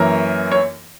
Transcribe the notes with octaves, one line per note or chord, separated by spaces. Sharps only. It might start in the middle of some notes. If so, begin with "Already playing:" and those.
Already playing: F#2 E3 A#3 A#4 C#5
C#5